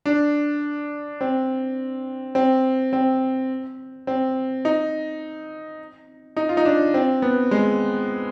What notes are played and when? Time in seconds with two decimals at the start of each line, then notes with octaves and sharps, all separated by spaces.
0.06 D4
1.21 C4
2.35 C4
2.93 C4
4.07 C4
4.65 D#4
6.37 D#4
6.49 F4
6.57 D#4
6.65 D4
6.94 C4
7.22 B3
7.51 G#3